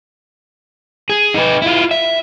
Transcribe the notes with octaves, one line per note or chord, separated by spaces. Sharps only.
G#4
D#4 B4
E4 F4
E5